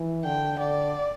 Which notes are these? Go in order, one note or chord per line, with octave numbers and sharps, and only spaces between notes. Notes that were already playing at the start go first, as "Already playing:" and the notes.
Already playing: E3
D3 G5
D3 D5